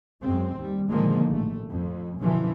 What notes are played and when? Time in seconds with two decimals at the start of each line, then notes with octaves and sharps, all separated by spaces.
0.22 F#2 G#3 C4
0.57 D#2 G3
0.90 A#2 D3 D#3 F3 G#3 A#3
1.27 A1 A3
1.71 F2
2.18 F#2 B2 D3 E3 F3